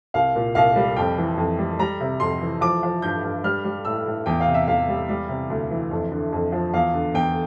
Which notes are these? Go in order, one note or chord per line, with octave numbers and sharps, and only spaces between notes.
C2 F5
A#2
C2 F5
G3
F2 G5
E3
F2
G3
G3 A#5
C3
F2 C6
E3
F3 D6
F3
G2 G6
G2
G3 F6
G3
A2 E6
A2
E2 G5
F5
C3
E5
E2 F5
G3
G3
C3
D2
E3
F2
D3
F2
F3
E2 F5
D3
E2 G5